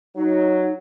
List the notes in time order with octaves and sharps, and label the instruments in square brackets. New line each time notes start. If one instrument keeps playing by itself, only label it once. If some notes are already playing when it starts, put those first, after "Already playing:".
[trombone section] F#3 [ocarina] D#4